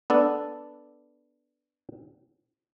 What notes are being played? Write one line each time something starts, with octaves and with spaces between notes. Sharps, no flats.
B3 D4 A4